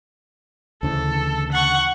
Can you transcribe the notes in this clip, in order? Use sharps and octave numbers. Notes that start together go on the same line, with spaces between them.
D2 C#3 E3 A4
F#5 C#6